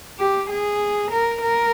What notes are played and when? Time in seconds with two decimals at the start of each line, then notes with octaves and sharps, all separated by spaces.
0.19 G4
0.50 G#4
1.11 A#4
1.42 A#4